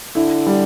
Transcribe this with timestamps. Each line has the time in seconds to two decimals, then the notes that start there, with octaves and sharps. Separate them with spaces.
0.15 D3 E4
0.47 G3